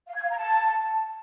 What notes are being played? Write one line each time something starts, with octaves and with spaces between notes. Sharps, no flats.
F5
G#6
F5
A#5
A5